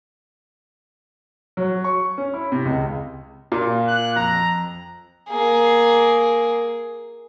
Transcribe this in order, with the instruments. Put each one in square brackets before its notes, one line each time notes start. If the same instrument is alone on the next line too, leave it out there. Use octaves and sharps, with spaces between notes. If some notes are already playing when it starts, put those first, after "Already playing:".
[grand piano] F#3
C#6
C#4
E4
C3
C#2
A#2 A#3 F4
[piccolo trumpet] F#6
[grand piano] F2 [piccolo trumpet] A#5
[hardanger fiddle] A#3 G#4